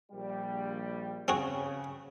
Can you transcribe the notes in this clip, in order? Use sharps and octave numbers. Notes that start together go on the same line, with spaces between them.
A#1 G3
C#3 C4 F#4 G#4